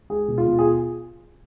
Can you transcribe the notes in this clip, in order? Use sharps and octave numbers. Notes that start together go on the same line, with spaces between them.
G#3 G#4
B2
F4
B2
G#4